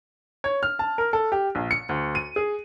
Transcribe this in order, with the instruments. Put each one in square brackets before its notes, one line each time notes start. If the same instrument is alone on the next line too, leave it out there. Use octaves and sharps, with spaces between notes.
[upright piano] C#5
F6
A5
A#4
A4
G4
A#1
C#7
D2
D#7
G#4